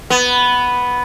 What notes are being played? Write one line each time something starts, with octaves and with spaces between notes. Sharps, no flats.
B3